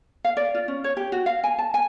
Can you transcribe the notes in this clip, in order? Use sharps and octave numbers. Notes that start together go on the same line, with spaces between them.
F5
D5
F4
C#4
C#5
G4
F#4
F5
G#5
A5
G#5